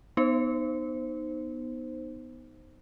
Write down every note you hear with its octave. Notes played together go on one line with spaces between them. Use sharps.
B3 D#4 C5